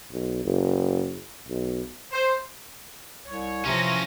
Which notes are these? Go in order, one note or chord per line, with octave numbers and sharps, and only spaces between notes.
B1
F#1
B1
C5
C2 C#5
C3 E3 F3 C#4 A#6